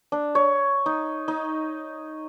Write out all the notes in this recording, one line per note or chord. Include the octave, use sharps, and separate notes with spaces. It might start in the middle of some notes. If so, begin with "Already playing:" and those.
D4
C#5
D#4
D#4